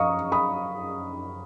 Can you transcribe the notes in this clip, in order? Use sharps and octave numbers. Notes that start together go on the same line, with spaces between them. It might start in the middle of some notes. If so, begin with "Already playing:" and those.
Already playing: F#2 F3 D#5 F5 A#5 C#6 D#6
B5 D#6